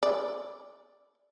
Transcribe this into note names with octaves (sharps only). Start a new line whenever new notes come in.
D5